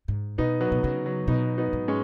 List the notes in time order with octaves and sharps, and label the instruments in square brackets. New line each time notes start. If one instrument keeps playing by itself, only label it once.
[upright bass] G#2
[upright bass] B2 [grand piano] B3 D#4
[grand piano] F#3 B3
[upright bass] B2
[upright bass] C#3 [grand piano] F#3
[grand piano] F#3
[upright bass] B2 [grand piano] B3 D#4
[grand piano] B3 D#4
[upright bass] G#2
[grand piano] G#3 C#4